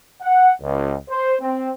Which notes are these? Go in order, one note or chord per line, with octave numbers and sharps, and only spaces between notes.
F#5
C#2
C5
C4